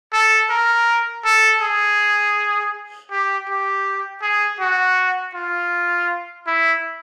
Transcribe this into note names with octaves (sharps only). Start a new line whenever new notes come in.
A4
A#4
A4
G#4
G4
G4
G#4
F#4
F4
E4